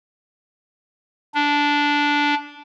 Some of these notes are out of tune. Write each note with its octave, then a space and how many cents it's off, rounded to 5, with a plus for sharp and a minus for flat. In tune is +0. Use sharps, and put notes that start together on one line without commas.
D4 -10